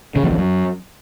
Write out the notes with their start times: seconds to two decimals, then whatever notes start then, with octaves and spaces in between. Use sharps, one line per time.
0.16 C#3
0.23 F2
0.31 E2
0.38 F#2